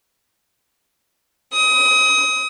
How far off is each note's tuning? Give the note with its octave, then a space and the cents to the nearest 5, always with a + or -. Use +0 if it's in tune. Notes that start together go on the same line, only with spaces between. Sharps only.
D#6 +30